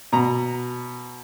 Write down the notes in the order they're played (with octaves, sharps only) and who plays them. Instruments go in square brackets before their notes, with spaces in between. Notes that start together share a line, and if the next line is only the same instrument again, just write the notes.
[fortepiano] B2 A#5